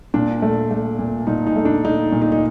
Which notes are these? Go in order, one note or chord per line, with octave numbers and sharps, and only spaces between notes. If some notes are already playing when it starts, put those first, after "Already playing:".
A#2 D4
A3
A3
A#2
A#2 D#4
D#4
A3
D4
A3 D#4
A#2
D#4
D#4